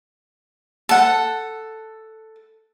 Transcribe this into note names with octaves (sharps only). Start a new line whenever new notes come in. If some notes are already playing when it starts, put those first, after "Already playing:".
A4 F#5